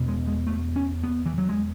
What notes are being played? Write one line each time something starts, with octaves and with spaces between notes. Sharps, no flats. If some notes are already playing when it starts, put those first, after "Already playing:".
Already playing: E2 B2
G#3
G#3
A3
C#4
B3
E3
F#3
G#3